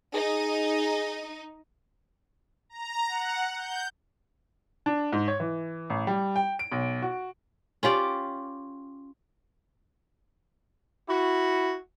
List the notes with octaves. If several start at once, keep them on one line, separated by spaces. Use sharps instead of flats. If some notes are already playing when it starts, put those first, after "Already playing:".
D#4 G#4
A#5
F#5
G6
D4
G#2
C#5
E3
A1
G3
G5
D7
B1
F#4
C#4 F4 G4 D5
E4 F#4